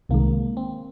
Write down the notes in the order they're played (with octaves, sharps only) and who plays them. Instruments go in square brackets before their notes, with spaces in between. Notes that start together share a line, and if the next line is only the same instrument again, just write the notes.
[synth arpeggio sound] C2 C3 D#3 G#3 [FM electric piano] A#3
[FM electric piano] C4